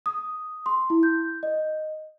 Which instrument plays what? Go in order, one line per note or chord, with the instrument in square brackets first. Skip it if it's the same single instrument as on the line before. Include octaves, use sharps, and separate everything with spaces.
[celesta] D#6
C6
E4
G6
D#5